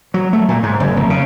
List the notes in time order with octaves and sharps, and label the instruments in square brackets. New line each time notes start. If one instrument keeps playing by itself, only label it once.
[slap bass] F#3
A3
A#2
G#2
F#1
F1
C#3